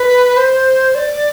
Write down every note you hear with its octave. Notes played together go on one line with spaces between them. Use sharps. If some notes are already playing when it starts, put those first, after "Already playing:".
Already playing: B4
C5
D5